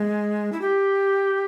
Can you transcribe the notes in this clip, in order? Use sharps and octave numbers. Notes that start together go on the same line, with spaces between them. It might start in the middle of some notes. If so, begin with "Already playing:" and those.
Already playing: G#3
E4
G4